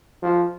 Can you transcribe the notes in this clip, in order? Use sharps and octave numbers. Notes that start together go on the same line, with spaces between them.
F3